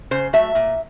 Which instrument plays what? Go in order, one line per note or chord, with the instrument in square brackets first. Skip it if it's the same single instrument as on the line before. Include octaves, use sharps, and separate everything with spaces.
[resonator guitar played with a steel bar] C#3 C5
F#3 A3 E5
A#2